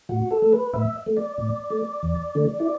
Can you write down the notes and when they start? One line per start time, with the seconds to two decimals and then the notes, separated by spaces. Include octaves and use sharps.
0.09 A2 F#4
0.31 A4
0.42 A3
0.53 B4
0.73 A2 E5
1.06 A3
1.17 D5
1.38 A2
1.70 A3
2.03 E2
2.35 D3 A3
2.60 E4